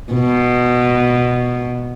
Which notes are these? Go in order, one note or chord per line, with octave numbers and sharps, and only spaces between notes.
B2